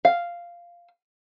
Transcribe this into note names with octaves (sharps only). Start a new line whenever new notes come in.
F5